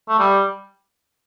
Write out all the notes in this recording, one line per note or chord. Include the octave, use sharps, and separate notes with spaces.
A3
G3